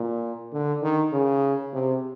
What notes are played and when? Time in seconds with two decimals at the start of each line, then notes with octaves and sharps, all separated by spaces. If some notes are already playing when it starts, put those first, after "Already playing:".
Already playing: A#2
0.52 D3
0.82 D#3
1.12 C#3
1.73 C3